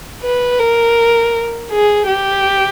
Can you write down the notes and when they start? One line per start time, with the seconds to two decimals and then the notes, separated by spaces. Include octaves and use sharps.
0.23 B4
0.59 A#4
1.71 G#4
2.07 G4